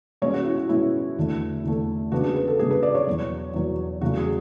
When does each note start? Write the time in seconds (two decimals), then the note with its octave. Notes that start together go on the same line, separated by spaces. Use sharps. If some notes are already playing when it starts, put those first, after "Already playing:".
0.22 B2 G#3 C#4 C#5
0.34 F#4
0.46 E4
0.57 F#4
0.69 B2 G#3 C#4 E4
1.17 E2 D3 A3
1.64 E2 D3 A3
2.12 C#3 G#3 B3 D4 F#4
2.24 G#4
2.36 B4
2.48 A4
2.59 C#3 G#3 B3 D4 G#4
2.71 B4
2.83 D5
2.95 C#5
3.07 E2 B2 F#3
3.54 E2 B2 F#3
4.01 E2 C#3 F#3 A3 C#4 F#4
4.17 G#4